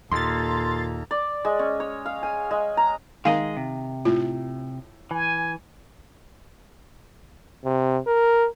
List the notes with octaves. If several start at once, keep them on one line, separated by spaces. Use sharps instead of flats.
D#2 A#2 A4 A#5 C6 A6
D5
G#3
C#4
C#5
F5
G#5
G#3
A#5
D#3 G#3 G#4 D#5 F5 A#5
C3
A2 F4
E3 G#5
C3
A#4